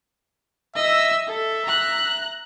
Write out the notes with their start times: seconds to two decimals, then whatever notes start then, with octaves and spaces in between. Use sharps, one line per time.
0.76 D#5 E5 E6
1.28 A4 E5
1.65 A#5 F#6